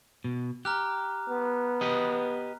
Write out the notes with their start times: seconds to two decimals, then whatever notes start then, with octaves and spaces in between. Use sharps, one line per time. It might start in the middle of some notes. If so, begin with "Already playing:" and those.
0.24 B2
0.65 G4 A#5 F6 F#6
1.29 B3
1.81 G4 B4 D#5